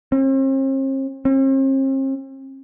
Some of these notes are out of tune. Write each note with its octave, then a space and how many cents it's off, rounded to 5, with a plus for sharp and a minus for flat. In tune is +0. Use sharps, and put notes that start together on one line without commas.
C4 +45
C4 +45